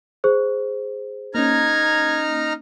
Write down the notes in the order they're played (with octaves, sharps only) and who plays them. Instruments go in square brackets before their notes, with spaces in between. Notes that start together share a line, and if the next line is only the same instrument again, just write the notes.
[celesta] G#4 C5
[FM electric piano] A#3 C#4 [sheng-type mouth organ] D#4 A#5 F6 [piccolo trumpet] G#6